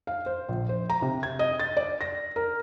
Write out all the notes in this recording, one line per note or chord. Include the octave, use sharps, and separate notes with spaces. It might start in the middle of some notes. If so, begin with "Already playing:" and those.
F5
C5
A#1
C5
A#5
C3
G#6
D#5
A6
D5
A#6
A#4